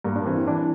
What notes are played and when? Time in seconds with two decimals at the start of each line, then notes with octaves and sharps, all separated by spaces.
0.04 G2 A#3
0.16 D4
0.26 E3 C4
0.47 E3 D4